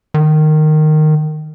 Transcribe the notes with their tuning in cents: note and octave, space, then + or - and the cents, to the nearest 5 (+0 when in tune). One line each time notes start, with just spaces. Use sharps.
D#3 -15